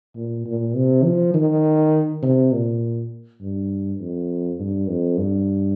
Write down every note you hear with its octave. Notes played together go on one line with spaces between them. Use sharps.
A#2
A#2
C3
F3
D#3
C3
A#2
G2
F2
G2
F2
G2